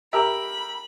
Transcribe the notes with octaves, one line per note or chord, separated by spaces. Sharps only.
G4 A#4 E5 B5